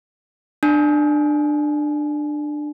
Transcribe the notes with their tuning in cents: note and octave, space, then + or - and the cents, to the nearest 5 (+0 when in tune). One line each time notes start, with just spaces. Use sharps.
D4 +20 G#5 +30